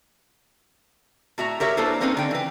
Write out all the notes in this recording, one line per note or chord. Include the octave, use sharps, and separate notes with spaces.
A2 F#4 E5 A#5
G4 A#4 C#5 E5
A#3 D4 E4 A4 B4 C5
A#3 C4 C#4 D#4 B4
D3 G5
E3 B4